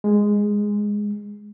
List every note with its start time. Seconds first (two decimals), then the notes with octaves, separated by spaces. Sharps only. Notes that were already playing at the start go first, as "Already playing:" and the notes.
0.04 G#3